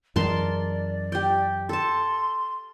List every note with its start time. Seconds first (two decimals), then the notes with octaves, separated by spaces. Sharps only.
0.16 F#2 E3 G#3 A#4 D5 A5 C6
1.12 G4 G5
1.69 A4 A5 C6